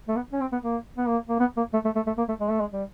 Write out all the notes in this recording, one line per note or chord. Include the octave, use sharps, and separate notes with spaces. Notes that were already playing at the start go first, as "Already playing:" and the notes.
A3
B3
C#4
C4
B3
A#3
B3
A#3
A#3
B3
A#3
A3
A3
A3
A3
A#3
A3
G#3
A3
G#3
G3